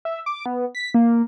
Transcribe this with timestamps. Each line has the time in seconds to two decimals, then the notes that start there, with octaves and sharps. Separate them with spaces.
0.05 E5
0.26 D6
0.46 B3
0.75 B6
0.94 A#3